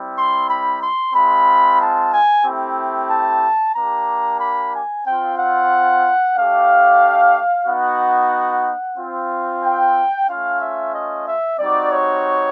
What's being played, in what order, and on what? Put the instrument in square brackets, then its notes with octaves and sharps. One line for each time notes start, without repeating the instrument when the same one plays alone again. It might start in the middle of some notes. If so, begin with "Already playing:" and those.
Already playing: [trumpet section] G3 C4 E4
C6
B5
C6
G#3 C4 F4 B5
A5
G#5
A3 C4 E4 G4
A5
A#3 D4 G4 A#5
B5
G#5
C4 F4 G5
F#5
A3 D4 G4 F5
B3 D#4 F#4 F#5
C4 F4
G5
A3 C#4 F4 F5
E5
D#5
E5
G3 C4 D#4 F#4 D5
C#5